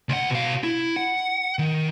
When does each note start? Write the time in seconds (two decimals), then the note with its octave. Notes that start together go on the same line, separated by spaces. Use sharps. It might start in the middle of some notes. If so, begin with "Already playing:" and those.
0.09 C#2 F#5
0.31 B2 F5
0.64 E4
0.96 F#5
1.59 D#3